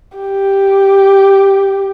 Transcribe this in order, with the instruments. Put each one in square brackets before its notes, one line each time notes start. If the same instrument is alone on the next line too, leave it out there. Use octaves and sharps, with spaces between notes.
[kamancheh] G4